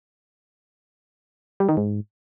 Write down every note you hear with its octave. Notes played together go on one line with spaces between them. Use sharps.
G3
D#3
G#2